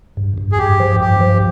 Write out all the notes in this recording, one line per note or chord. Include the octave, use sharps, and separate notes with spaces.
G2
G2
G#4
G2 G4
F3
G2 G4
F3